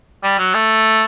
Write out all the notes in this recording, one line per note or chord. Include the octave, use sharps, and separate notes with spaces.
G3
F#3
A3